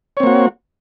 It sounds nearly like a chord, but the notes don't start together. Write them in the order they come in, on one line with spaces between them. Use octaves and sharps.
C#5 C4 A#3 F#4